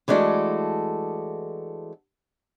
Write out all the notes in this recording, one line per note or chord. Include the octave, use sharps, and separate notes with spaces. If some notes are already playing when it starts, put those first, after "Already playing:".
E3 G#3 A3 D4 F#4 A4